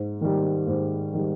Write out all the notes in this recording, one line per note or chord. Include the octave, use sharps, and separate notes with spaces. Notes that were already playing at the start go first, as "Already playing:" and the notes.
Already playing: G#2
D#3 G3
G#2
D#3 G3